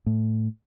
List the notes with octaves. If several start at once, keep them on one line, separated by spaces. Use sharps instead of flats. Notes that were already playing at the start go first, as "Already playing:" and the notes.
A2